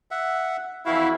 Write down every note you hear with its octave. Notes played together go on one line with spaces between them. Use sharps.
E5 F#5
F2 E3 E4 F#4 F5